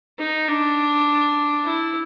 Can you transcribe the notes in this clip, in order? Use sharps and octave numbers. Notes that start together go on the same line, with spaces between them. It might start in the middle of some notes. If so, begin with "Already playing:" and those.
D#4
D4
E4